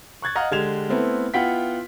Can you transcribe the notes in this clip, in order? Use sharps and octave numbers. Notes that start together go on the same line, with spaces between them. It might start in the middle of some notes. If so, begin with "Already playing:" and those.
C#6 F#6 G#6 A6
D#5 F5 F#5 A#5 F6
D3 G#3 G4 G#6 E7 F7
A3 B3 C4 E4 A4 B4
B3 E4 F4 F#5 G5 B6